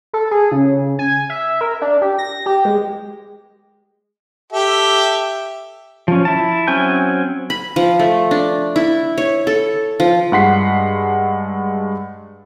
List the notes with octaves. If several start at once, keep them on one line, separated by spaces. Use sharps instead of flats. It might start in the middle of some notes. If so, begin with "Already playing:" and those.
A4
G#4
C#3
G#5
E5
A#4
D4
G4
A#6
G4
G#3
G4 A4 E5
F3 C#4
E4 A5
F#3 C4 C#4 G#5 G6
B5
F3
A3
D4
E4
C#5
A4
F3
G2 G#3 F#5 C6 B6 C7